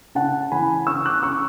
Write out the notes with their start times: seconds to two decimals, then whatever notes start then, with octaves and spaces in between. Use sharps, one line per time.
0.15 C#3 F#5 A5
0.52 E3 G#5 B5
0.87 C#3 C#6 E6
1.06 D6 F#6
1.22 C#3 C#6 E6